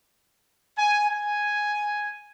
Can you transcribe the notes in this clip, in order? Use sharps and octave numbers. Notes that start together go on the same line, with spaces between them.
G#5
G#5